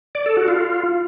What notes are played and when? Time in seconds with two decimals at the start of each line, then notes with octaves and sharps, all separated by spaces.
0.15 D5
0.26 A4
0.37 F#4
0.48 F4